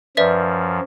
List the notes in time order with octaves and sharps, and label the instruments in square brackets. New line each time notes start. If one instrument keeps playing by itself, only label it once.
[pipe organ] F#2 F3 [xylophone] B4 D5 E5